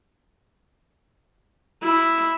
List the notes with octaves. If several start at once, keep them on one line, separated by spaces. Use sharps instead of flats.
E4